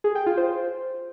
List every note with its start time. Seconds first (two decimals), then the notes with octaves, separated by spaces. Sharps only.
0.04 G#4
0.15 G5
0.26 F4
0.37 C5